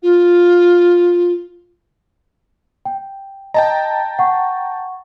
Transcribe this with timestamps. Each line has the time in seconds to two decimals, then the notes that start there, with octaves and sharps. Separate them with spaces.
0.02 F4
2.85 G5
3.54 D#5 G5 A5 A#5
4.19 F#5 C#6